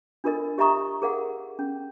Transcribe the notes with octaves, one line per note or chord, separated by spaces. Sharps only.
D4 F4 A4 A#4 D#5
G4 D#5 E5 A#5 C#6 D#6
G#4 A#4 F5 F#5
C#4